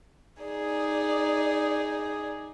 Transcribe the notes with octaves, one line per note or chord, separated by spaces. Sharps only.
D#4 G#4 D5